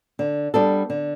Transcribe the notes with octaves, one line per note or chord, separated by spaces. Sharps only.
D3
G3 B3 D4 A4
D3